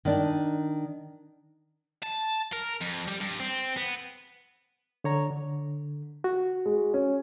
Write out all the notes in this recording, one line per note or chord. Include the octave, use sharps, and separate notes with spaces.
D#3 D4
A5
A#4
F2
G3
G2
C4
B3
D3 C#5 A#5
D3
F#4
G#3
C#4